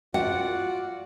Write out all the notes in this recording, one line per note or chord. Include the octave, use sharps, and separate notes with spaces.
F4 F#4 D5 F#5